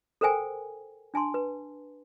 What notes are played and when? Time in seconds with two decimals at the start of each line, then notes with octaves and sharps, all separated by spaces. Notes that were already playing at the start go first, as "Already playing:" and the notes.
0.21 A4 A#4 C5 G5 G#5
1.14 D4 G#5 A5 C6
1.34 B4